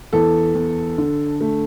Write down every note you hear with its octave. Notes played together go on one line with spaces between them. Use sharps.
E2 A4
E2
D3
A3